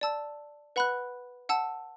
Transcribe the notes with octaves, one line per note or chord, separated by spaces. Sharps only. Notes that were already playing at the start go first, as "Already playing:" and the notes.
D5 A5 E6
B4 F#5 B5 F#6
F#5 A5 E6